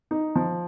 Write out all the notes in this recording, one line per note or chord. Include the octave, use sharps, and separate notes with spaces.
D#4
F3